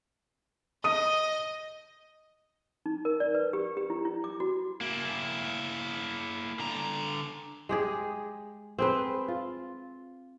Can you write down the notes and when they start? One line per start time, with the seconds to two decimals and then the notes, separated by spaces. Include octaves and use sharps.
0.84 D#5 D#6 D#7
2.86 D#4
3.05 A#4
3.20 D5
3.35 B4
3.53 G4
3.77 G4
3.90 E4
4.05 E4
4.24 D6
4.40 F#4
4.81 A#3 E4
6.59 D3 A#5
7.69 G#3 G4 G#4
8.78 C4 G#4 B4
9.28 F4